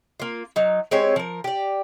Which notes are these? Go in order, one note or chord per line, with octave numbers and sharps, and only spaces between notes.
A#3 F4
F#3 D#4
G#3 C4 G4 C#5
F3 A#4
G4 D5